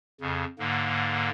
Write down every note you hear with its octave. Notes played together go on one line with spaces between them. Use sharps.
F2 C#3
G#2 D3 A#3